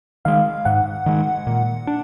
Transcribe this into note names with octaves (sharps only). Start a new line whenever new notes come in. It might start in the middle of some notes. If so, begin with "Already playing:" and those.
D#3 G#3 F5
G#2 F#5
D#3 G#3
A#2
D4